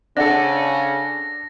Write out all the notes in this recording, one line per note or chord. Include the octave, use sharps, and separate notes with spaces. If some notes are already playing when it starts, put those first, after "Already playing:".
C#3 D4 A4 C5 E5 F#5 A#6